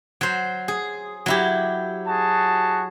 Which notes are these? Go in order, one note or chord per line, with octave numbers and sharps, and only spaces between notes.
F#3 C5
G#4
F#3 E4 G4
F#4 G#4 A5